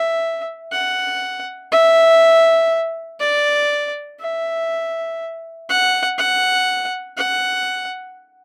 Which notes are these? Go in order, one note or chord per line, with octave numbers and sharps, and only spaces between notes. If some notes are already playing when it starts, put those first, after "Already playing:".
Already playing: E5
F#5
E5
D5
E5
F#5
F#5
F#5